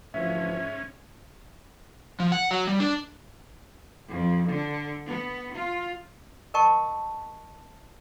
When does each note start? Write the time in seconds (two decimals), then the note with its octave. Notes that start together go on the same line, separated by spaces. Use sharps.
0.14 D2 G#2 E3 F3 C#4 E5
2.20 F3
2.32 F#5
2.51 F#3
2.67 G3
2.80 D4
4.10 F2
4.49 D3
5.07 B3
5.54 F4
6.54 A#4 D#5 G5 A5 C#6